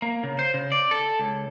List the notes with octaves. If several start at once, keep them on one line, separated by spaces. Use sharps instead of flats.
A#3
C#3
C5
C#3
D5
A4
C#2